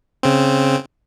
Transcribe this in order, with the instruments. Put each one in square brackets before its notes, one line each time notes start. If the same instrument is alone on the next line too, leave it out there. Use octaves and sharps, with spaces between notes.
[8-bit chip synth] C#3 C4